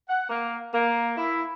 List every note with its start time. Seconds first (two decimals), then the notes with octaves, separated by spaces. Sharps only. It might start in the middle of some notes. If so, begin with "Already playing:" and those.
0.09 F#5
0.30 A#3
0.74 A#3
1.18 E4